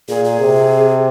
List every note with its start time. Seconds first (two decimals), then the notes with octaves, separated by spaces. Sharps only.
0.08 A#2 G#4
0.25 G#4
0.40 C3